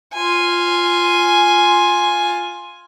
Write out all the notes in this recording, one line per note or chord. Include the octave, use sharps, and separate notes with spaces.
F4 G#5